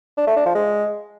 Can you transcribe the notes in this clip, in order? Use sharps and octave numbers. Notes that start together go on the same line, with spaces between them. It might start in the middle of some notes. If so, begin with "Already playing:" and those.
D4
A3
D4
F3
G#3